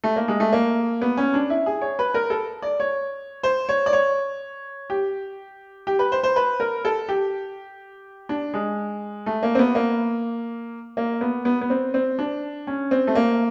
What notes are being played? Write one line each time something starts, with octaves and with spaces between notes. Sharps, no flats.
A3
A#3
G#3
A3
A#3
B3
C#4
D4
E4
G#4
C#5
B4
A#4
A4
D5
C#5
C5
C#5
D5
C#5
G4
G4
B4
C5
C5
B4
A#4
A4
G4
D4
G#3
A3
A#3
C4
B3
A#3
A#3
B3
B3
B3
C4
C4
D4
C#4
C4
A3
A#3